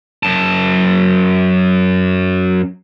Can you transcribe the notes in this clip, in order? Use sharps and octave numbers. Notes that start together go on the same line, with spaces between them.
F#2 A5